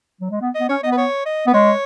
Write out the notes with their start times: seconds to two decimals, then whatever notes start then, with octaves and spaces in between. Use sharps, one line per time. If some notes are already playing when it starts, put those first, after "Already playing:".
0.21 F#3
0.31 G#3
0.41 B3
0.55 D#5
0.60 B3
0.69 C#4 C#5
0.83 B3 D#5
0.92 B4
0.97 C#5
1.26 D#5
1.47 B3 B4
1.53 G#3 C#5